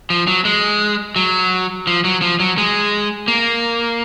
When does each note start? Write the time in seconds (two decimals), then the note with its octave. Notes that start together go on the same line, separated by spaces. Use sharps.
0.10 F3
0.27 F#3
0.45 G#3
1.16 F#3
1.87 F3
2.04 F#3
2.22 F3
2.40 F#3
2.58 G#3
3.28 A#3